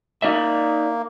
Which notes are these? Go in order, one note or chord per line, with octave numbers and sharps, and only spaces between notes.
A#3 D#4 D5 E5